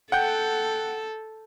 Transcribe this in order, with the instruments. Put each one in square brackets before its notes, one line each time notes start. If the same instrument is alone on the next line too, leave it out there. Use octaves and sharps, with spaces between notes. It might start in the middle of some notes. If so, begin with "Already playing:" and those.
[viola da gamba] A4 [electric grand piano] F#5 G5 G6